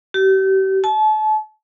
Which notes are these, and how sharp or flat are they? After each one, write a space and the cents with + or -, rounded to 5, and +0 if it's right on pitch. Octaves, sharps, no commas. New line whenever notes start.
G4 -35
A5 -35